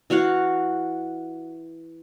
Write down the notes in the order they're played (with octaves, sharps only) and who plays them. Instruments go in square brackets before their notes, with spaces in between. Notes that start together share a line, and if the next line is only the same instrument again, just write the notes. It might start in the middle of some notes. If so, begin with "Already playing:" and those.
[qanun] E3 F#4 F5 F#5